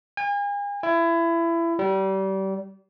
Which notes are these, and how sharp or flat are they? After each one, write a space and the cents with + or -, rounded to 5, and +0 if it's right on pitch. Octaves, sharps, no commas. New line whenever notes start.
G#5 -40
E4 +25
G3 -30